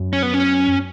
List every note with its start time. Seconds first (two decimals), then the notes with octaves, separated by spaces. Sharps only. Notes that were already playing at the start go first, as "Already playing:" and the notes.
Already playing: F#2
0.13 C#4
0.23 B3
0.34 C#4